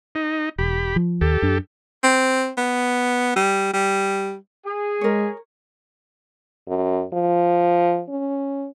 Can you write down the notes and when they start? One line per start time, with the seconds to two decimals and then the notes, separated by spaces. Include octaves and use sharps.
0.15 D#4
0.58 E1 G4 B5
0.96 F3
1.21 D#2 G4 A4
1.42 F#2 D4
2.03 C4
2.57 B3
3.36 G3
3.73 G3
4.66 G#4
5.01 G#3 A#4 C#5
6.68 F#2
7.13 F3
8.09 C#4